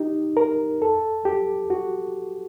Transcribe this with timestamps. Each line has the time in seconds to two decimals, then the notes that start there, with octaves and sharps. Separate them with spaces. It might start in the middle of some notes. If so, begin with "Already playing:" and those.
Already playing: D#4 G4
0.37 A#4
0.82 A4
1.25 G4
1.70 F#4